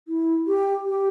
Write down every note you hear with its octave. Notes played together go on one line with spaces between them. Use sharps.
E4
G4
G4